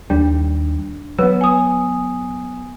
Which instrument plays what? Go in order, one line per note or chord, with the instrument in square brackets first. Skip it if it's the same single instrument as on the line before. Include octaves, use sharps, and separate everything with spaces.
[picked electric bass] D#2 G3 [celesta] D4
[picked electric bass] F#3 B3 [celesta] B4
[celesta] G#5 D#6